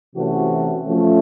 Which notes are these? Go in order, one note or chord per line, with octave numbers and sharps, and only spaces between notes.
C3 E3 A3 C#4 F#4
F3 A3 C#4